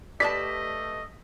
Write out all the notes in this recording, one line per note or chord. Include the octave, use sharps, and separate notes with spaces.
A3 G4 B4 D5 D#5 A5 B6